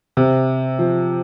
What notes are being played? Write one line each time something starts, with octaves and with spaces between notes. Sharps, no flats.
C3
F3